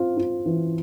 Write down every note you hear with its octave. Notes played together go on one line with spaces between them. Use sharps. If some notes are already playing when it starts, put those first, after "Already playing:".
Already playing: C4 F4
F4
E3